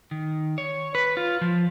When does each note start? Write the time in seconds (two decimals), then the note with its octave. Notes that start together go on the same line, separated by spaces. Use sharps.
0.11 D#3
0.58 C#5
0.95 B4
1.17 F4
1.41 F3